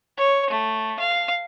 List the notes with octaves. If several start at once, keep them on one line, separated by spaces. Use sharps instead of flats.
C#5
A3
F5